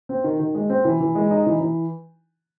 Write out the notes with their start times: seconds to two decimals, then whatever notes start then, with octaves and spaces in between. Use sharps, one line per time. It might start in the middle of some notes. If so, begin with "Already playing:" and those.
0.09 C4
0.24 D#3
0.39 D#3
0.55 G#3
0.70 C4
0.85 E3
1.00 E3
1.15 G#3
1.31 D#4
1.46 E3
1.60 E3